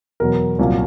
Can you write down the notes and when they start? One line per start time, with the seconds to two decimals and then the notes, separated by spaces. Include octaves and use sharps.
0.20 E2 B2 F#3 A#4
0.59 C2 A#2 F#3